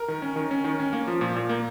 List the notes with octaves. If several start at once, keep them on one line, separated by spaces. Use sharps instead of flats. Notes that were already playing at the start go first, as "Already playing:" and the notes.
Already playing: A#4
D#3
C#4
D#3
C#4
D#3
C#4
A#3
F3
A#2
A#2
A#3